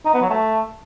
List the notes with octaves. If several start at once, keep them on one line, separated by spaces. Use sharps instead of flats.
D#4
B3
F#3
A3